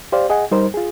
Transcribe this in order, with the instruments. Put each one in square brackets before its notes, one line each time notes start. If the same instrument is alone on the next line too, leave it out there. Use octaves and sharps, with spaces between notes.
[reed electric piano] G4 C5 D5 F5
G#4 D#5 F#5 G#5
G3 D#4 A#4 C5
F4 G#4